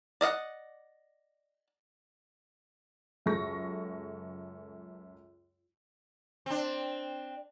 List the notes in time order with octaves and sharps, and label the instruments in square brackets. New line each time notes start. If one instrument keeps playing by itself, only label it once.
[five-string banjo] D5 D#5 F5 F#5
[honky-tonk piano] C#2 F#2 G#4 A4 C#6 A#6
[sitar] C4 D4